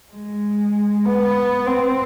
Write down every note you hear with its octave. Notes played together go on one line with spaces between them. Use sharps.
G#3
B3
C4